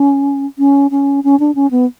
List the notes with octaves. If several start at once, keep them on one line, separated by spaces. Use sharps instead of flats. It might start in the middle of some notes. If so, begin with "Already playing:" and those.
Already playing: C#4
C#4
C#4
C#4
D4
C#4
B3